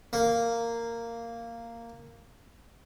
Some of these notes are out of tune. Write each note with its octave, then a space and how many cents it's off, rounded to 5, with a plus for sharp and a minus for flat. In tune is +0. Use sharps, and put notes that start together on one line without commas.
A#3 -10